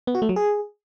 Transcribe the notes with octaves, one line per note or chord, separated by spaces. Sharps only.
B3
F#4
A3
F#3
G#4